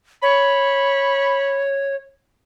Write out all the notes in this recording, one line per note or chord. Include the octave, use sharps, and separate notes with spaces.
C#5 B5